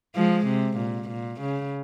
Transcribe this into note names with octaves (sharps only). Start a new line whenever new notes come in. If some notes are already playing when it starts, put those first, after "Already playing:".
F3 G#3
C3
A#2
A#2
C#3